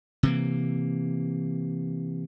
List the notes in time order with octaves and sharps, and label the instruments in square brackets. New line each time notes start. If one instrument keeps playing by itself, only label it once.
[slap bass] C3 E3 A#3